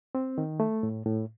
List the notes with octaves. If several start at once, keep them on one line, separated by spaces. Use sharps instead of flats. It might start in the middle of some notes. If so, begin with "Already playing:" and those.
C4
D#3
A3
A2
A2